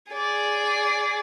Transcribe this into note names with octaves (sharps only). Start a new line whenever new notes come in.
G#4 D5